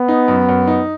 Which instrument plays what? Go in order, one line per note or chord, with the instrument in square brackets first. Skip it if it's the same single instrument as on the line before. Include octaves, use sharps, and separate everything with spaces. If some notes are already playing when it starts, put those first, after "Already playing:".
Already playing: [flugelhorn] B3
[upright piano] D#4
F#2
F#2
D#4